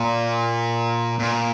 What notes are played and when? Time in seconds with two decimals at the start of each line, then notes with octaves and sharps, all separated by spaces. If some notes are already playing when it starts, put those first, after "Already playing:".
Already playing: A#2
1.19 A#2